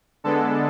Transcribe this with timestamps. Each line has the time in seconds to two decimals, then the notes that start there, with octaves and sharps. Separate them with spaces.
0.24 D3 G#3 B3 D4 A4